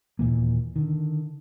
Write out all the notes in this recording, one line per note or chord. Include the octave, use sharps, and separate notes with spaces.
D#2 A#2 E3 A#3
D3 D#3